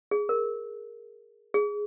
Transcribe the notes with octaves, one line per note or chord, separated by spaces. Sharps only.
G#4
A#4
G#4